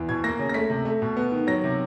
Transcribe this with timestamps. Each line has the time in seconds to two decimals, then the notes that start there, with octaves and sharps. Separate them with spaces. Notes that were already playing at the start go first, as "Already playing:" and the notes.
Already playing: E2 E3
0.09 B2 G#6
0.24 A#3 A#6
0.39 C#3
0.49 A#6
0.54 A3 B6
0.70 C3
0.85 A3
1.02 B2
1.17 B3
1.32 D#3
1.47 F#3 A#6
1.63 C3